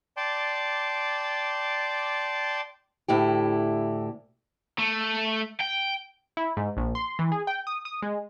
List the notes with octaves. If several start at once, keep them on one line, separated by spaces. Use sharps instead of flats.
D5 G5 A5 C6 D6
D2 A2 E4 G4
A3
G5
E4
G#2
A#1
C6
E3
G#4
G5
D#6
D#6
G#3